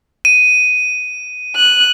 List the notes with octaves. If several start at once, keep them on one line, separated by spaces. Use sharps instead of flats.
D#7
F#6